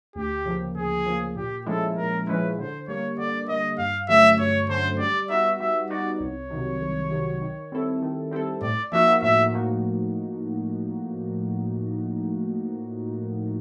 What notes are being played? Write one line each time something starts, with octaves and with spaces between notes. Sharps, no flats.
D2 G4
C#3 F3 A#3
D2 G#4
C#3 F3 A#3
A#2 G4
F3 G#3 C#4 E4 A4
A#2 A#4
F3 G#3 C#4 E4 B4
D3 C5
G3 A#3 C#5
D3 D5
G3 A#3 D#5
G2 F5
D3 F#3 A3 C#4 E5
G2 C#5
D3 F#3 A3 C#4 C5
G3 D5
B3 D#4 F#4 E5
G3 E5
B3 D#4 F#4 D5
C2 C#5
C3 D#3 F#3
C2
C3 D#3 F#3
D#3
G3 C4 E4 A4
D#3
G3 C4 E4 A4
A2 D5
F3 A#3 D#4 F#4 E5
A2 E5
F3 A#3 D#4 F#4